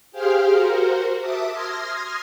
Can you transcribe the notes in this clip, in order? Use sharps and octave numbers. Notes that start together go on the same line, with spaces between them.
G4 G#4 C5 F5 F6
F#4 A#4 C5
E5 A5 D6 D#6
C6 D#6 F6 G#6 A#6